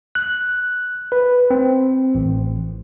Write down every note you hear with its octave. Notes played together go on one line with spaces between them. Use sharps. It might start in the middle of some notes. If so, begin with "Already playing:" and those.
F#6
B4
C4
A1